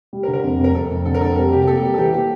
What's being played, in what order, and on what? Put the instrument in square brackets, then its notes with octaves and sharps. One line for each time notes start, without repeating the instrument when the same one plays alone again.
[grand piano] G3
[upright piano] A#4
[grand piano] D3
[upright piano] A#4
[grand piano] F2
F2
[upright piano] A#4
[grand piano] F2 [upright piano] A4
[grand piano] F2
[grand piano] D3 [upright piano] A4
[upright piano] A#4
[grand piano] F2 [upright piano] A4
[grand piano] G3 [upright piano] A#4
[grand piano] C3 [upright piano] G4
[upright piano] G4
[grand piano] A#3 [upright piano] A4
[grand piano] G3 [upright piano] G4
[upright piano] A4
[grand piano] E3 [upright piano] G4
[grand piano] A#3 [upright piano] G4